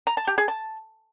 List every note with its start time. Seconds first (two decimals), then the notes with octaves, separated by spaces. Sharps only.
0.07 A#5
0.17 A5
0.27 G4
0.38 G#4
0.48 A5